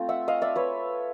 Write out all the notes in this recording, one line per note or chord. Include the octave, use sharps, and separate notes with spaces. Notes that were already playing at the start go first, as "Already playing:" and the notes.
Already playing: A3 C4 F4
E5 F#5
D#5 F5
D5 E5
B4 C#5